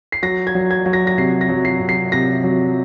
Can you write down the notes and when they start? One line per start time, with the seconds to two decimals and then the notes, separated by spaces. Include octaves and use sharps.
0.12 C7
0.22 F#3 A#6
0.47 G#6
0.55 F#3
0.71 G#6
0.86 F#3
0.93 A#6
1.07 A#6
1.18 C3 C7
1.41 A#6
1.49 F#3
1.65 C7
1.80 C3
1.89 C7
2.12 C3 A#6
2.44 F#3